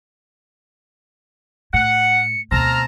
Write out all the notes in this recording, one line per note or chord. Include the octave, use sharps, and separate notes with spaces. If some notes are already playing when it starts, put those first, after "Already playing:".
A2 F#5 C#7
D2 B2 C4 A5 A#5 F6